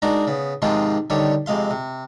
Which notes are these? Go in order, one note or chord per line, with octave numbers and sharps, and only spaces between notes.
G#3 D4 D#4 F#4 A#4
C#3 B3
G#2 C3 D#3 F3 G#3 F4
D3 D#3 G3 C#5
F2 C3 G#3 F5 C6
C3